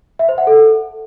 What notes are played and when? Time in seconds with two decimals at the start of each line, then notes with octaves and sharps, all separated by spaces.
0.19 E5
0.29 C5
0.38 F#5
0.47 A4